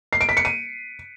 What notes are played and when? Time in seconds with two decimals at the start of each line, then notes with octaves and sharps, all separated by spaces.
0.13 C7
0.21 D7
0.29 B6
0.37 C#7
0.45 D#7